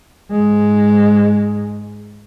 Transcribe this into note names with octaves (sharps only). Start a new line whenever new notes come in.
G#2 G#3